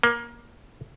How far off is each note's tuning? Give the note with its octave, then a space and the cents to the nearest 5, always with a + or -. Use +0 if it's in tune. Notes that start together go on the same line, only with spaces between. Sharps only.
A#3 +20